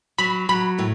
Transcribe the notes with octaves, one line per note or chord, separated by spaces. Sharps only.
F#3 B5
F#3 B5
A2